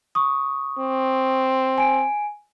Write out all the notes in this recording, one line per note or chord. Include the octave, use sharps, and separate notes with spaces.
C#6 D#6
C4
G#5 D7